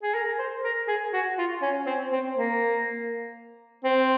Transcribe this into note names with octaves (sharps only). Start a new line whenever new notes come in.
G#4
A#4
C5
A#4
G#4
F#4
F4
C#4
C4
C4
A#3
C4